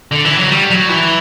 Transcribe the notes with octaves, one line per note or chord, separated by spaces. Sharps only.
D3
E3
F#3
G3
F#3
E3